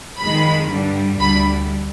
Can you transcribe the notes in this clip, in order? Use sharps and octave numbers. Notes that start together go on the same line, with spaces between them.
F2 D#3 G#3 B5
G2 D3 G3
D2 D3 G3 B5